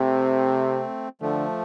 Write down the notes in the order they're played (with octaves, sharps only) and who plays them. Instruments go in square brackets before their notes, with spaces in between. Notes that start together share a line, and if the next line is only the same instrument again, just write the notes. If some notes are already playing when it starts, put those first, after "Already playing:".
Already playing: [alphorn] C3 [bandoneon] A3 C4
[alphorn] D3 [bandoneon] F3 A3